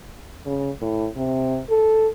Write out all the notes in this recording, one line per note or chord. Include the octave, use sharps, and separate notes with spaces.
C#3
A2
C3
A4